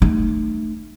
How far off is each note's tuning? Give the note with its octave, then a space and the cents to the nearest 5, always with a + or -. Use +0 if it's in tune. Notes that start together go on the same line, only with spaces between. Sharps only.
A3 +0 D#4 -35